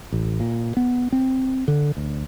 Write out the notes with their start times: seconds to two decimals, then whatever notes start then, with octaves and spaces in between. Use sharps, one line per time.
0.12 A1
0.40 A#2
0.77 B3
1.12 C4
1.68 D3
1.97 D2